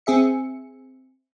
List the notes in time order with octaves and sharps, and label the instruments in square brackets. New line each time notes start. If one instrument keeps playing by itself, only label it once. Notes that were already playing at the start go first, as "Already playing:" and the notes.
[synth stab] C4 G#4 E5 C#7